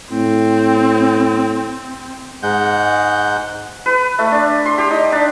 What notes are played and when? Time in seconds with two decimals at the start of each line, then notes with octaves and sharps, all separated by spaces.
0.10 A2 C4
2.43 G#2 G#3 F#5 G6
3.86 B4
4.19 A3
4.31 D4
4.66 C6
4.78 G4
4.91 D#4
5.12 D4